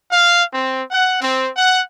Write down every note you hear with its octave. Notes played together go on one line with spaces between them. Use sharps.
F5
C4
F#5
C4
F#5